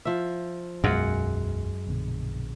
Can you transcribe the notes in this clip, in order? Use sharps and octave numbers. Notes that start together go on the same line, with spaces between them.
F3 E5
E1 B1 F#2 G#3 B3 F5 F#5
A#1 B2 D3